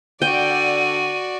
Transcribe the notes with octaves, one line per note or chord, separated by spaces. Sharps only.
D3 F#4 D5 G5 D#7